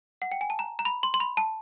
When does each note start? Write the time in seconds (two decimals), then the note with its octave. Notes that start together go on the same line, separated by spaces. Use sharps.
0.22 F#5
0.32 G5
0.41 G#5
0.50 A5
0.59 A#5
0.79 A#5
0.85 B5
1.03 C6
1.14 C6
1.20 B5
1.37 A5